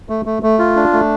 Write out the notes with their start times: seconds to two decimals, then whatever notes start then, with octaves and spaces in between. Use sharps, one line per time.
0.09 A3
0.26 A3
0.43 A3
0.59 F4
0.76 D4
0.93 A3